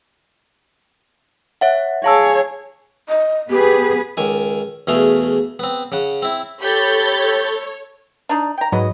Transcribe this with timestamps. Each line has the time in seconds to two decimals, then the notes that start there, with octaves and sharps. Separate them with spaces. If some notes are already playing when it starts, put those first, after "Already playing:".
1.61 C#5 E5 F#5
2.04 G#4 C#5 F5 A5 E6
3.09 D#5
3.50 B3 G4 G#4 B4
4.17 C#2 D#3 G#5
4.87 E2 B2 A3 G#4 F5
5.59 B3 C4
5.92 C#3 F#5
6.22 C4 E4
6.61 G4 A4 C#5 B5 G6 A6
8.29 D4 D#4
8.58 G5 A#5
8.72 G#2 F#3 B3 D#5